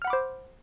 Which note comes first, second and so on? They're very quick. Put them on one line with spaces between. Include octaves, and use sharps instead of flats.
F6 F#5 B5 D6 C5